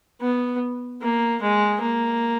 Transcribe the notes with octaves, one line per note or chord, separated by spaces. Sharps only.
B3
A#3
G#3
A#3